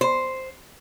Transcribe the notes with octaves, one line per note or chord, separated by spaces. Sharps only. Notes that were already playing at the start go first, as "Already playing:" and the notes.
C5